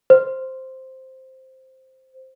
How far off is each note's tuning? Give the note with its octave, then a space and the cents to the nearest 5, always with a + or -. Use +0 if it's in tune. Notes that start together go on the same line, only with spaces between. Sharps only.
C5 +0